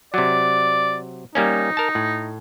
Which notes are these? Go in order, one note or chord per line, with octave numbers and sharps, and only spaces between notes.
C3 F#3 D5
G3 A#3 C#4 D#4
A#4 A5
A2